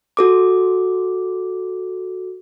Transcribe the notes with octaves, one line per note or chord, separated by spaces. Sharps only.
F#4 A4 D6